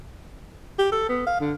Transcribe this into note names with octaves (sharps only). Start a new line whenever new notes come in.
G4
A4
B3
F5
D3